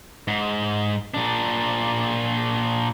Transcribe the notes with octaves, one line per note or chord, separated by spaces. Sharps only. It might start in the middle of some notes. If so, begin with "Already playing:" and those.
G#2
A#2 D4